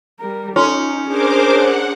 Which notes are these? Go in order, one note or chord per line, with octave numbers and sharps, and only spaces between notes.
G3 A#4
C#4 D#4 F4 F#4 A4
D4 G#4 A#4 C5 D6
C5 C#5 F#5